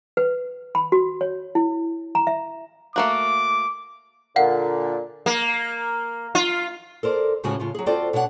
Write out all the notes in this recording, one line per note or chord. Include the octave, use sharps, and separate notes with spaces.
B4
B5
F#4
C#5
E4
A#5
E5
A3 A#3 F#4 D6
A#2 D3 F5 F#5
A#3
F4
A4 A#4 C5 D5
D2 A2 C#3 G#3 F#4 G#5
A2 C#3 F4
F#3 G#4
C4 F4 F#4 A4 C5 D5
B2 D4 C#5 D5 F#5